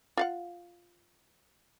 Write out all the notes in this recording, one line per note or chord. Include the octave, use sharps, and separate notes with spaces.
F4 F5 F#5